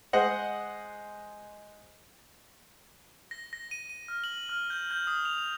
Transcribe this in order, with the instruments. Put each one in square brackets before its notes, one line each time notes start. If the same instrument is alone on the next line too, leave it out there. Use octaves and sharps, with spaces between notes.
[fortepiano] G#3 C5 D#5 F#5
[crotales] A#6
A#6
D#7
D#7
F6
F#7
F6
G6
G6
D#6
F7
F7